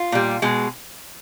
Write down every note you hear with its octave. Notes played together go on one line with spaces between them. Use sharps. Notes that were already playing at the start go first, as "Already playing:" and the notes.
Already playing: F4
A#2 G3
B2 G#3